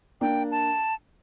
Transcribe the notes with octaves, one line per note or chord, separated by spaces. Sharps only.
A#3 D4 G5
A5